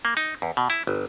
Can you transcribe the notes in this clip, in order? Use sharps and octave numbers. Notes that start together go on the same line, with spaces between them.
A#3
D#4
E2
B2
E4
G1